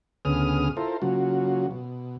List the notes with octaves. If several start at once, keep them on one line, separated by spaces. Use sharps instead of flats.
D2 C#3 B3 G#4 D#6 F6
E4 F4 A4 A#4 C5
C#3 F#3 A#3 F4 F#4
B2